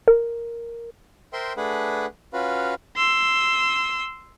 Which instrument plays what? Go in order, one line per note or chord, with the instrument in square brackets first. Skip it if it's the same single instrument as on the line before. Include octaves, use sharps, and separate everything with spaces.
[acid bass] A#4
[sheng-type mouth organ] A#4 C5 E5 G5 C6
A3 D4 G#4 B4 F#5
C#4 F4 F#4 B4 F5
[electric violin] C6 E6